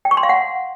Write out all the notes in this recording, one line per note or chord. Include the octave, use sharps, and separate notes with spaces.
G5
C#6
C6
F5
F#5